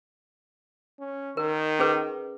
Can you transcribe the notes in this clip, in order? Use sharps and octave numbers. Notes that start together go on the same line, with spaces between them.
C#4
D#3 A#4
C#4 G#4 B4